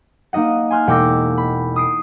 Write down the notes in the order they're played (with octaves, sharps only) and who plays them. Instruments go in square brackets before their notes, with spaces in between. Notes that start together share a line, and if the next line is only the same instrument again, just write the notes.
[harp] A#3 D#4 D#5 F#5
G#5 C6 F6 F#6
E1 F#5 G5 D6 E6 A#6
B5
D#6 C7 D7